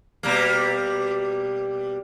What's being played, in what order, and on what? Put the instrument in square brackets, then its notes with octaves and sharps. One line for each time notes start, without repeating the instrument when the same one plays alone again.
[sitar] B2 G3 A#3